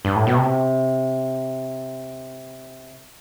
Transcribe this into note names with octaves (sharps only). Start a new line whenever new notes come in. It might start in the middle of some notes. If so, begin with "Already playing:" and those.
G2
A2
B2
C3